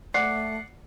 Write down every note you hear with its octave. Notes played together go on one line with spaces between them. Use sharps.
A3 D5 F#5 C7